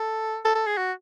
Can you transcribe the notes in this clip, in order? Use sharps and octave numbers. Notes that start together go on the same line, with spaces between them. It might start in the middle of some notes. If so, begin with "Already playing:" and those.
Already playing: A4
A4
A4
G#4
F#4